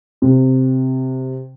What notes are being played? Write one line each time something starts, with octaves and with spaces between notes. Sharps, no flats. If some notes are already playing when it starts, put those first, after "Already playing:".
C3